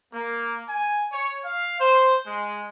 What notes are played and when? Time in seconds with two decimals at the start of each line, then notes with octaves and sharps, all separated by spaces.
0.14 A#3
0.69 G#5
1.12 C#5
1.45 F5
1.80 C5
2.26 G#3